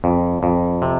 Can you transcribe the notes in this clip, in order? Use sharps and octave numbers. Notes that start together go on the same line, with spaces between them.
F2
F2
C3